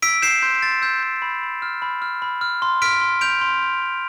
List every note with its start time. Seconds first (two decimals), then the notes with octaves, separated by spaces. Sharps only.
0.02 E6 B6 D7
0.22 G6 C7 E7
0.42 C6 G6
0.62 C6 A6
0.82 E6 G6
1.03 G6
1.22 B5
1.42 B5
1.62 F6
1.82 B5
2.02 F6
2.22 B5
2.41 F6
2.62 C6
2.82 F6 B6 D7
3.01 C6
3.21 G6 D7 F7
3.41 C6
3.62 G6
3.82 C6